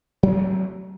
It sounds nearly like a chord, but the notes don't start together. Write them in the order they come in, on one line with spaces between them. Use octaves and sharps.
F#3 G#3 C4 A3